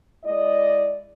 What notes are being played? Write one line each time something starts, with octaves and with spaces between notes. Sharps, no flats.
G#3 E4 D5 D#5